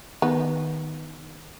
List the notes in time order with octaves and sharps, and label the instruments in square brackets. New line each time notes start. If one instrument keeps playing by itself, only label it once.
[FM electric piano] D#3 [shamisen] B3